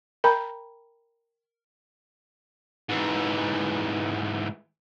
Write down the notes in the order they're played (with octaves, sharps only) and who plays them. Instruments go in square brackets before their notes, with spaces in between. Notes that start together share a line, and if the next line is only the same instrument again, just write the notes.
[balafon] A#4 G5 A#5 B5
[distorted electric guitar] G#2 E3